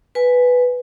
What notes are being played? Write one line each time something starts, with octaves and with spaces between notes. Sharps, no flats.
B4 G#5